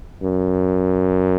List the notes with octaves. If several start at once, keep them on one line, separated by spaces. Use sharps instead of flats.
F#2